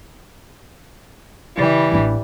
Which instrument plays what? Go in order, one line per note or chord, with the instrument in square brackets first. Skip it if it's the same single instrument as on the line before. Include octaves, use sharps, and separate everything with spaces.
[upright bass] C#3 [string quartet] E3 G3
[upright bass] A1 D4